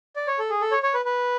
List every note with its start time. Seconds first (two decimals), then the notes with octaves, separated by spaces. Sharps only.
0.16 D5
0.27 C#5
0.39 A4
0.50 G#4
0.61 A4
0.71 C#5
0.83 C#5
0.94 B4
1.05 B4